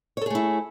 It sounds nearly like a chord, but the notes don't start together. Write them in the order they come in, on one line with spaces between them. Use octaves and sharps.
C#5 A4 G#4 A3 E4